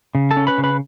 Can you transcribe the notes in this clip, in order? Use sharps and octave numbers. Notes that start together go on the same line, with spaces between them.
C#3
A4 A5
C#4
B4 B5
C#3
B4 B5